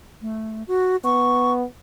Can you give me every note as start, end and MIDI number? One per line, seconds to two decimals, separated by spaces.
0.22 0.63 57
0.68 0.96 66
1.04 1.63 59
1.04 1.53 85